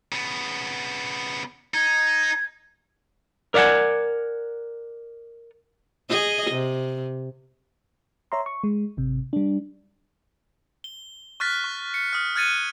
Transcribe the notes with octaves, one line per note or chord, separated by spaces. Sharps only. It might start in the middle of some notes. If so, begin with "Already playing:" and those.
C#3 B3
D#4 G#6
A#4 D5 E5 F#5 G#5
G#4 D#5
C3
C#5 E5 A#5 C6
C#6
G#3
G#1 C3
G3 D4
G7
C#6 F6 F#6 A6 B6
C#6
C#7
D#6 F6
F6 F#6 G#6 A6 C#7 D#7